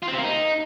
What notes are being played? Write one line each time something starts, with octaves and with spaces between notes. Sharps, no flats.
F4
C4
C3
A#3
D#4